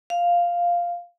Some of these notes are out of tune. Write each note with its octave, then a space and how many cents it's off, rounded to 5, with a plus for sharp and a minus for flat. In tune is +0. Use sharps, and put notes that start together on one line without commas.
F5 +0